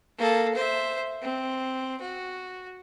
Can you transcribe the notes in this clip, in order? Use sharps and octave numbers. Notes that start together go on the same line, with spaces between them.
A#3 A4
C5 E5
C4
F#4